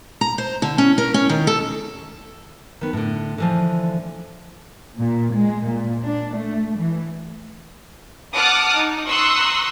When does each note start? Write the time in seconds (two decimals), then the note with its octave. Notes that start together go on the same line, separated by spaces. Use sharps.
0.21 A#5
0.38 C5
0.62 D3
0.78 C#4
0.98 A#4
1.14 C#4
1.29 D#3
1.47 A4
2.81 D#3 B3
2.93 A2 D3
3.38 D3 E3 F3
4.98 A#2
5.34 G#3
5.66 A#2
6.04 D4
6.37 A3
6.78 E3
8.34 F#5 A5 D6 D#6 F6 F#6
8.76 D#4
9.08 A#5 C6 C#6 D#6 E6 F#6